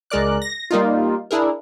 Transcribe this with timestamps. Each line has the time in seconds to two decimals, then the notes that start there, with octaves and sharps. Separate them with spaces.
0.10 C#2 G#3 A#4 D5 F#6
0.42 A#6
0.71 G3 A#3 D#4 F4
1.31 D4 E4 G#4 A#4